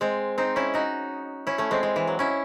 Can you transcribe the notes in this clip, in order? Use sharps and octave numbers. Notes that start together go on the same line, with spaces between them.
G#3 C4
C4 D#4
C#4 E4
D#4 F#4
C#4 E4
A3 C#4
G#3 C4
G#3
E3
F#3
C#4 E4